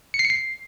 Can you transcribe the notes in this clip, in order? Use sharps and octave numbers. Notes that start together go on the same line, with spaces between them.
C#7
C7
C#7
C7